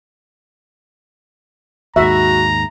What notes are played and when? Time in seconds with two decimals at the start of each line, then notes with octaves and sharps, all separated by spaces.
1.96 D#2 G#2 F#4 E5 A#5